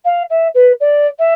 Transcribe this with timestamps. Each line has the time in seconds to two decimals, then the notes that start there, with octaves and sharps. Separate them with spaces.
0.04 F5
0.29 E5
0.54 B4
0.80 D5
1.18 E5